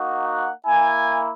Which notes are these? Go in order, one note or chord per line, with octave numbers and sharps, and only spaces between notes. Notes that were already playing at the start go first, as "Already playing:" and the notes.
Already playing: A#3 D#4 F#4
F#5
A#3 E4 G#5